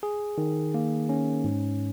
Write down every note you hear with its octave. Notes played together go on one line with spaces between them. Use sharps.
G#4
D#3
A#3
C#4
G#2